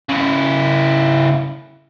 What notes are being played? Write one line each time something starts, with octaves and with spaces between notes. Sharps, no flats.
C#3 E4